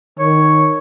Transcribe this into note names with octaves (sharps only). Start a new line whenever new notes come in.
D#3 C#5